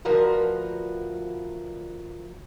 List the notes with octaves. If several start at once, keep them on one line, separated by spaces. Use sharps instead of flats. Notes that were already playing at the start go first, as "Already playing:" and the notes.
D2 F3 F#4 A#4 B4